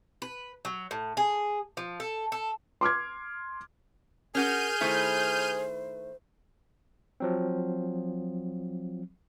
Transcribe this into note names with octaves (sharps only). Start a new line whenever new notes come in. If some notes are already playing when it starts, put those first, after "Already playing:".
B4
F#3
A2
G#4
F3
A4
A4
C6 D6 F6 G#6
C#4 F#4 G#4 A#4 F6 G6 D#7
D#3 A3 E4 C5
F3 F#3 C4